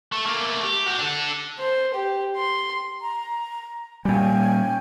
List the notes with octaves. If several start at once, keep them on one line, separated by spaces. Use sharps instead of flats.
A3
A3 A#3
G4
F#4 G4
D4 A4
C5
G4
C6
A#5
A#2 G3 C#4 G5 G#5